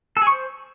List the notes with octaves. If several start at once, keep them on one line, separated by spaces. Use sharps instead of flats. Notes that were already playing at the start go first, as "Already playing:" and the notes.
A4
G#4
C#6
C5